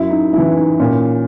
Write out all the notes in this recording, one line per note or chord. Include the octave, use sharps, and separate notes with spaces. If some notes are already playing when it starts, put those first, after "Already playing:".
Already playing: F#2 E4
D#4
C#3 E3 E4
D#4
A#2 C#4